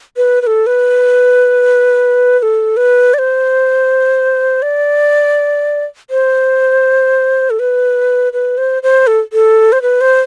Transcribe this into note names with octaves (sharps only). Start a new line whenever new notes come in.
B4
B4
A4
B4
B4
A4
B4
D5
C5
D5
C5
A4
B4
B4
C5
C5
A4
A4
C5
B4
C5